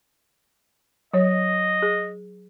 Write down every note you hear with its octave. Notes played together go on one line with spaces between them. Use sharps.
F#3 C#5 D#5
G#4